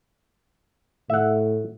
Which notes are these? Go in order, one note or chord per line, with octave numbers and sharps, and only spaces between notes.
A2 E5 F#5